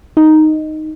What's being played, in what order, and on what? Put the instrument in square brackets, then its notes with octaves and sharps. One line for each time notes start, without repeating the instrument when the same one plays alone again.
[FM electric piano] D#4